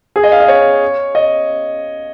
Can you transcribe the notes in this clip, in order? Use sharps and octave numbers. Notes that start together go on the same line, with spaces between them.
G#4
D#5
F5
D#5
C#5
D#5